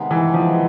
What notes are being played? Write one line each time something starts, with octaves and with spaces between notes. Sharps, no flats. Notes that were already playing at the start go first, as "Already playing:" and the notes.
Already playing: C3 D#3 G#3 B3 D#4
E3
F3